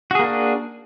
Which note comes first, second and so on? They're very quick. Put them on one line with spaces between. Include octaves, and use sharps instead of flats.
F#4 G#4 A#3 D4